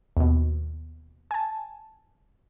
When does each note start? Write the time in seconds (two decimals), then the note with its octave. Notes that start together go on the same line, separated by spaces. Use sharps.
0.17 D#2 B2
1.31 G#5 A5